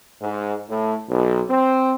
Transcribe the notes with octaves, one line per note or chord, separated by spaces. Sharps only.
G#2
A2
B1
C4